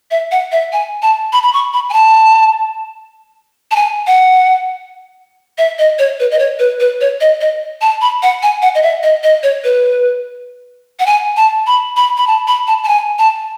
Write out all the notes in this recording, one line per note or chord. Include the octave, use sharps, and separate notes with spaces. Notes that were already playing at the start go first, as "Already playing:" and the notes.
E5
F#5
E5
G#5
A5
B5
B5
C#6
B5
G#5
A5
A5
G#5
F#5
E5
D#5
C#5
B4
D#5
C#5
B4
B4
C#5
D#5
D#5
A5
B5
F#5
G#5
F#5
D#5
E5
D#5
D#5
C#5
B4
F#5
G#5
A5
B5
B5
B5
A5
B5
A5
A5
G#5
A5